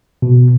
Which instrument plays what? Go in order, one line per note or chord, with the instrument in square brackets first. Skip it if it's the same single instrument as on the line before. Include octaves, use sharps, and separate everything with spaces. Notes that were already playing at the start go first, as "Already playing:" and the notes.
[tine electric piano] B2